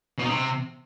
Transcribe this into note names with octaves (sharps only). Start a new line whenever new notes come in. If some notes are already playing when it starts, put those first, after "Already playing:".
B2
D#4
C3